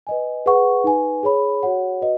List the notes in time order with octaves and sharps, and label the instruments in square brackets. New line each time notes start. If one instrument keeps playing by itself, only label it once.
[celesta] B4 D#5 G#5
G#4 B4 F#5 C#6
D#4 B4 G#5
G#4 C#5 B5
F#4 C#5 F#5
F#4 B4 D#5